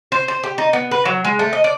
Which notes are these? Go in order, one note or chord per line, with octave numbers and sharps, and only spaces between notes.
C5
C5
G4
D#4
B3
B4
F#3
G#3
A3
D#5
D5